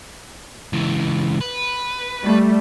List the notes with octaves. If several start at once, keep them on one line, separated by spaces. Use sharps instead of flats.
C#2 E3
B4
G3 A3